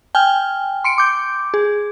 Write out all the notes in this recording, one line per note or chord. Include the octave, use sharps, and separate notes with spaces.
G5 G#5 F6
C6 C#7 D7
D6 G6
G#4